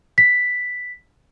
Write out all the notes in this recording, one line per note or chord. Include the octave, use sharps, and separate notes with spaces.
B6